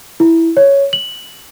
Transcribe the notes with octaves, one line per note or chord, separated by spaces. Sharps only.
E4
C#5
F#7